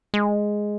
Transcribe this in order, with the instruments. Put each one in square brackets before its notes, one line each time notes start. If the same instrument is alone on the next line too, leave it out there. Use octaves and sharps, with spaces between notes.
[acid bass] G#3